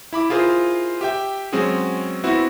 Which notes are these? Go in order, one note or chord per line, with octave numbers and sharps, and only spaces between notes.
E4 B5 D6
E4 F4 G#4 A#4 C5
G4 E5 G5
F#3 G#3 C4 C#4 F#4 G#4
B3 C4 E4 F#4